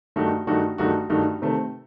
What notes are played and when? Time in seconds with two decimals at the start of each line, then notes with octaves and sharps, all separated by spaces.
0.16 G2 D#3 A3 D#4 F#4
0.47 G2 D#3 A3 D#4 F#4
0.78 G2 D#3 A3 D#4 F#4
1.10 G2 D#3 A3 D#4 F#4
1.42 C3 D#3 A3 C4